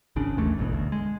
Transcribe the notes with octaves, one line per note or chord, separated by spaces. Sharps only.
G#1 C#2 C#3 D4
A1 D#2 E3 A3
E1 A1 G#2 B2
D2
G#3